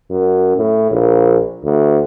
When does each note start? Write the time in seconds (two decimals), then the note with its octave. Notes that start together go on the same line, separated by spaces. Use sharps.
0.10 F#2
0.57 A2
0.91 A#1
1.64 D2